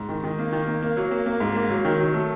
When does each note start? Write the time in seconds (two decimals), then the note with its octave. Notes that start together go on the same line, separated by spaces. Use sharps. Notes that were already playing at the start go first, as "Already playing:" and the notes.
Already playing: G#2
0.09 D#3
0.23 D#3
0.39 A#3
0.52 D#3
0.68 A#3
0.82 A#3
0.97 F#3
1.11 A#3
1.26 A#3
1.40 G#2
1.55 A#3
1.70 F#3
1.85 D#3
2.00 F#3
2.14 A3